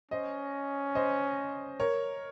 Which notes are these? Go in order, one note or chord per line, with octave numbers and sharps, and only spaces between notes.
C#4 C5 D#5
C5 D#5
A#4 C#5